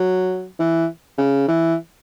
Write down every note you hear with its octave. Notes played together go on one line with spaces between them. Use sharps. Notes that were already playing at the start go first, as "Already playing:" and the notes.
Already playing: F#3
E3
C#3
E3